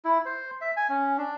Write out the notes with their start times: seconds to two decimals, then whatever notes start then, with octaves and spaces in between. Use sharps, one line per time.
0.05 E4
0.26 C5
0.61 E5
0.77 G#5
0.89 C#4
1.18 D4